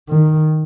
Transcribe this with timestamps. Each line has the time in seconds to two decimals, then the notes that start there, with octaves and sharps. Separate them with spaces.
0.09 D#3